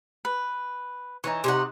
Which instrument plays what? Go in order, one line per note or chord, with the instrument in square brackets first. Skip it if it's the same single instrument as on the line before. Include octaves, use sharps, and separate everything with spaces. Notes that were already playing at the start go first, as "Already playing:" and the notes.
[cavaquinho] B4
[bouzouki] E3 [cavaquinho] D#4 C#5 C#6
[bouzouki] C3 D#4 F#5 [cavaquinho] C#6